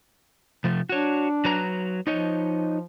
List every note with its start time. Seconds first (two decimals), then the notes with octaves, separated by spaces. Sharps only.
0.64 C3 F3 A3
0.89 D4 F#4 C#5
1.45 F#3 B4 A#5
2.07 F3 D#4 C#5 D#5